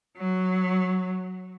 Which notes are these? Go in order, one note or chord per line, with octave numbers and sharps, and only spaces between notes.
F#3